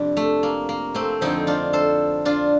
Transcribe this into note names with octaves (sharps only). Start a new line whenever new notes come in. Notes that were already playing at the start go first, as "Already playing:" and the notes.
Already playing: F2 C3 G3 D4
A3
A#3
A#3
A3 C4
F2 D3 F3 C4 D#4
D4 F4
A4 C5
D4 F4